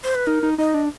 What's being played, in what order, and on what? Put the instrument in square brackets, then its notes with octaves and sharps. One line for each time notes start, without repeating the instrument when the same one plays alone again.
[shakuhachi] C5
B4
[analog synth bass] D#4 [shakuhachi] A#4
[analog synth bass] D#4
[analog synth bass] D#4 [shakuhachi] D#5
[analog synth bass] D4